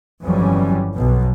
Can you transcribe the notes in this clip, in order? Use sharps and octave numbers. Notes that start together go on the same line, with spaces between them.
G1 F2 E3 F#3 G3 C#4
B1 B2